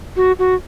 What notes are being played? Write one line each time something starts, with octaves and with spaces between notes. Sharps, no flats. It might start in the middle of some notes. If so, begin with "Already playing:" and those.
F#4
F#4